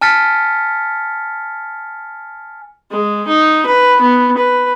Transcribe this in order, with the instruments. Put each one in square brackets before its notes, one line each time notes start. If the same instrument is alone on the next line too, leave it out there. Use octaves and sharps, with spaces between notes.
[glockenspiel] G#5 A5 F6 A6 B6 C#7
[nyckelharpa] G#3
D#4
B4
B3
B4